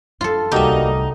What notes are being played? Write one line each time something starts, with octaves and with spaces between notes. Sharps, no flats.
F#2 F4 A4
D1 C2 G3 A#3 D#4 F#4 G4 E5